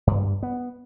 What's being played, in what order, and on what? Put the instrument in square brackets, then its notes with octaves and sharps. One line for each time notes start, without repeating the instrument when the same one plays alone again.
[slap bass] G2
B3